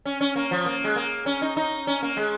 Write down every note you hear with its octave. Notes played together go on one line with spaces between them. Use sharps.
C#4
C#4
A#3
F3
A#3
G#3
A#3
C#4
D#4
D#4
C#4
A#3
G#3